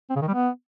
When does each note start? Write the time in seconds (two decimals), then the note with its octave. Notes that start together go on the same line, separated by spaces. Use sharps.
0.10 C4
0.16 C#3
0.22 D#3
0.28 G3
0.34 B3